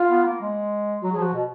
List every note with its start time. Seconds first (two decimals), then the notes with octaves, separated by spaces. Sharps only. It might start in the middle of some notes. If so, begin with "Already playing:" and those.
Already playing: F4
0.09 B3
0.25 A#3
0.41 G#3
1.02 F#3 F#4
1.12 F3 G#4
1.22 F#4
1.33 B2